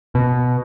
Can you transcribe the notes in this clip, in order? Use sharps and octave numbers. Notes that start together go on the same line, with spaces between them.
B2